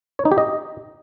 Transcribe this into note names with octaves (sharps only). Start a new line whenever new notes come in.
C#5
D#4
G4
D#5